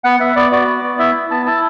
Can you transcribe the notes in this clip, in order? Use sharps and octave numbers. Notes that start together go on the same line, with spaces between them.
B3 F#5
B3 E5
B3 D5
F#4 D5
B3
B3
E4 E5
E4
B3 A5
E4 A5